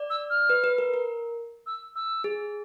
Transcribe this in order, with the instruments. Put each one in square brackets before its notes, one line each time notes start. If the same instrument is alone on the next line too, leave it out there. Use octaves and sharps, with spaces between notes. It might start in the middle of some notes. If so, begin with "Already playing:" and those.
Already playing: [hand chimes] D5
[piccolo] E6
F6
[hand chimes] B4
B4
A#4
A#4
[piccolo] E6
E6
[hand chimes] G#4